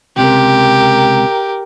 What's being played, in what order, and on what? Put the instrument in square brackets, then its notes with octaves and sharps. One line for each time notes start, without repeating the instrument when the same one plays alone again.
[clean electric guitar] C#2 C3 [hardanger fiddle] G4 A#4